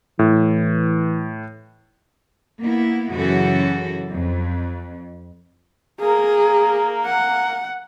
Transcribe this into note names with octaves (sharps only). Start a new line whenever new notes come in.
A2 E3
A#3 B3 E4
F#2 C#3 E3 F#4 A4
F2
A#3 G#4 A#4
F#5